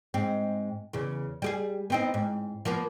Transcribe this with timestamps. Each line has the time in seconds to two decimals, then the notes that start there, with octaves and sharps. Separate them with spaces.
0.14 G#2 C4
0.93 E2 C#3
1.42 G3 G4 G#4
1.90 B3 C4 D#4
2.14 G#2
2.65 F3 A#3 B3